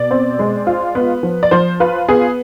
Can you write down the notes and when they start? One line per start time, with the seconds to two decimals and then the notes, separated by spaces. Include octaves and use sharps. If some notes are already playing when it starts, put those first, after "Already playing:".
Already playing: B2 D5
0.11 C4
0.39 G#3
0.67 F4
0.95 B3
1.23 F3
1.43 D5
1.51 F3 C5
1.80 F4 B4
2.08 B3 G#4